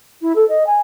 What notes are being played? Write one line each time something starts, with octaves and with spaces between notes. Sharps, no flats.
E4
A4
D#5
G#5